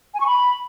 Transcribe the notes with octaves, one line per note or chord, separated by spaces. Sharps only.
G#5
C#6
B5